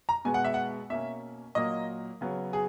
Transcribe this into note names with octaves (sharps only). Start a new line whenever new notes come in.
A#5
B2 G#3 B3 G#5
F#5
E5
F#5
B2 A#3 C#4 E5
A#2 F#3 A#3 D#5
C#3 F#3 B3
G#4